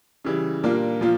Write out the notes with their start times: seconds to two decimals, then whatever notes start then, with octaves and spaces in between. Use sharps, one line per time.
0.25 C#3 E3 G3
0.63 A#2 G3 A#3 D4 F4
1.01 A#2 F3 A#3 F4